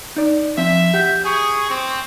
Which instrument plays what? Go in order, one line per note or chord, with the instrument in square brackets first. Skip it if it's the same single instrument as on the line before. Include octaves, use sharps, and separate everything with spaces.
[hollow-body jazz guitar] D#4 D5
[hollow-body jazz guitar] F3 C4 [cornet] E5
[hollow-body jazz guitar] G4 F#5 [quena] G6
[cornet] G#4 [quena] C#6
[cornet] C4